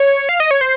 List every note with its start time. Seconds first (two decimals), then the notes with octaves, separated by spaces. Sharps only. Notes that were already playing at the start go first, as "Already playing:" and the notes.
Already playing: C#5
0.29 F5
0.40 D#5
0.51 C#5
0.61 C5